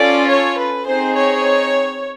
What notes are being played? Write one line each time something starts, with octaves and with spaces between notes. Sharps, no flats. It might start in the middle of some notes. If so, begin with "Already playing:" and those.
Already playing: C#4 F4 A4 D5
C#5
B4
C4 D#4 G#4 C5
C#5